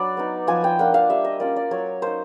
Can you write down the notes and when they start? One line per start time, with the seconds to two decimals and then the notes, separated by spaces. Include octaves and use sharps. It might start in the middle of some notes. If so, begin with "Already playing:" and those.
Already playing: F#3 D4 B4 D5
0.17 B3 D#4
0.47 F3 G#5
0.64 G5
0.79 A#3 D4 F4 F#5
0.94 F5
1.10 G3 E5
1.25 D#5
1.40 A#3 C#4 F4 D5
1.56 D5
1.71 F#3 C#5
2.02 A#3 D#4 C5